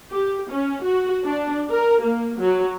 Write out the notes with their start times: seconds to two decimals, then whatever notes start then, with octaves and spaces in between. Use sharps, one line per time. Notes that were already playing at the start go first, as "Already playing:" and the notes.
0.11 G4
0.51 C#4
0.83 F#4
1.25 D4
1.70 A#4
2.02 A#3
2.40 F#3